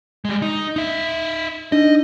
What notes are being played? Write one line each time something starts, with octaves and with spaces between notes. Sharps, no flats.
G3 G#3
D#4
D#4 E5
D4 D#4 D#5